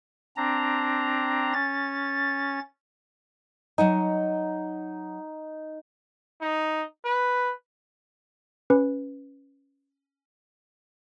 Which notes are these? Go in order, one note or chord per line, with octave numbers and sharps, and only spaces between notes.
C4 D4 A#5
C#4 A6
F#3 D#4 F#5 G#5
D#4
B4
C#4 B4